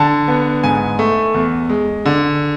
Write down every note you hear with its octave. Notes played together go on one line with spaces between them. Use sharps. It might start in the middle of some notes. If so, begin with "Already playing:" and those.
Already playing: D3 A5
B3
G#2 G#5
A3
E2
G#3
D3